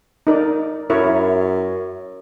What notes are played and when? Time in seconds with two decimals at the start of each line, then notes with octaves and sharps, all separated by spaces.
0.27 D#4 A#4 D5
0.90 F#2 E4 A#4 C#5